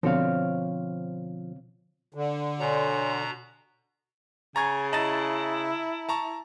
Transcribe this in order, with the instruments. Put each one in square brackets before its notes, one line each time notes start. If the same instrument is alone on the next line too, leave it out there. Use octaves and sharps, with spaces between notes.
[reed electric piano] B2 D3 [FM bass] F3 [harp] C4 C#5 F5
[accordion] D3
[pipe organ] B2 A#5 [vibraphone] C#5 G#5 C6
[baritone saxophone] C#3 [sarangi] G#5 [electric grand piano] A#5 C#6 G#6 [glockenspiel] A6
[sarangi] E4 [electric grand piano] D#5 A6 [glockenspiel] A5 A#5 F#7
[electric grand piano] A5 A#5 C#6